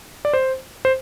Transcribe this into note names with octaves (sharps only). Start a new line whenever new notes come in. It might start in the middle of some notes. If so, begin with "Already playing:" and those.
D5
C5
C5